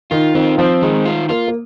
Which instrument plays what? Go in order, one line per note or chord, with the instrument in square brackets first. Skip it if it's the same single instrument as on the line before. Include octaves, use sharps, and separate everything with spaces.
[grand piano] D#3 [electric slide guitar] F4
[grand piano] D#3 [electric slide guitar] C4
[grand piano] F3 [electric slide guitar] C4
[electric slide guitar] D#3 [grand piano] G#3
[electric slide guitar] F4
[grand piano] A#3 [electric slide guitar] F4
[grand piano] A#3